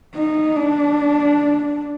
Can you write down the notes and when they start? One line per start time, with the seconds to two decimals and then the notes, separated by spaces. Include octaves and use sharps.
0.16 D#4
0.56 D4